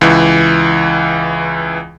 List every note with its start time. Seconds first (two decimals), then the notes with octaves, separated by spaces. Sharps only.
0.01 C#2 E3